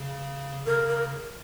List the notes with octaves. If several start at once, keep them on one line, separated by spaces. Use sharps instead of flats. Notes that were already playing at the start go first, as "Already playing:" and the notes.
Already playing: C#3
C#3 A#4
A#4